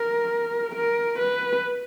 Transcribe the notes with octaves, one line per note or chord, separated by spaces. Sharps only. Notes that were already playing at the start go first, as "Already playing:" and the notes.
Already playing: A#4
A#4
B4